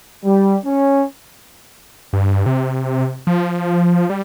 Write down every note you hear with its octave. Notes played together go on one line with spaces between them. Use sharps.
G3
C#4
G2
C3
F3
G3